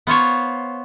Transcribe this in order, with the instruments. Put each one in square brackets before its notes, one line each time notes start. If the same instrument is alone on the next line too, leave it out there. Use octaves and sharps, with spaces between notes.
[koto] B3 F4 C5 C#5